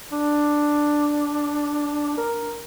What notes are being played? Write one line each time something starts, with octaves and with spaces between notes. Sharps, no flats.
D4
A#4